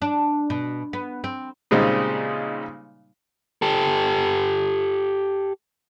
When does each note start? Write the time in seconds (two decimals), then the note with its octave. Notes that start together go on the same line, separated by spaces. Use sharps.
0.02 D4
0.50 B2
0.93 B3
1.24 C4
1.71 A#2 C#3 G3 G#3 C4 D#4
3.62 G4 A4